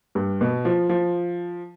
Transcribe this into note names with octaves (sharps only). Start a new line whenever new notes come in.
G2
B2
F3
F3